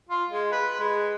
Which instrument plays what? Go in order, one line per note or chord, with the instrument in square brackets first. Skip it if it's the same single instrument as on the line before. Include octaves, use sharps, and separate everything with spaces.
[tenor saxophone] F4
G#3
B4
G#3